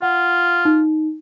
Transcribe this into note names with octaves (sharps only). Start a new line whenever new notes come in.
F4 F#5
D#4